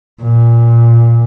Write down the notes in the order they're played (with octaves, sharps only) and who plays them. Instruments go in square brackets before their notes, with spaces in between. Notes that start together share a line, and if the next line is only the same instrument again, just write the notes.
[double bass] A#2